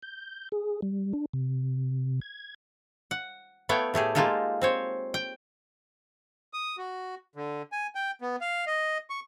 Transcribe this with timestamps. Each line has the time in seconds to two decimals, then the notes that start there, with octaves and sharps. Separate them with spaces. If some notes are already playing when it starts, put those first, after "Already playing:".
0.02 G6
0.52 G#4
0.82 G3
1.13 D4
1.33 C3
2.21 G#6
3.11 F#5
3.69 A3 B3 E4 C#5 F5 G5
3.94 A2 A3 G4 G#4
4.15 G#3 A#3 D#4 F4 G4 A4
4.62 C4 C5 C#5
5.14 G5
6.53 D#6
6.78 F#4
7.36 D3
7.72 G#5
7.95 G5
8.21 B3
8.41 F5
8.67 D#5
9.10 C#6